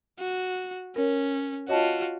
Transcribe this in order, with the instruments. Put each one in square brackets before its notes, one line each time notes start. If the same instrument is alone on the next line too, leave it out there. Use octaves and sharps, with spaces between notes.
[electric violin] F#4
[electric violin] C#4 [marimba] A#4 C#5
[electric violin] F4 F#4 [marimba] C#5 D#5 A5